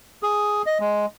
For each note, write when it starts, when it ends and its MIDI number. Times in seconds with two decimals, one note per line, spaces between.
0.23 0.62 68
0.66 0.78 75
0.80 1.06 56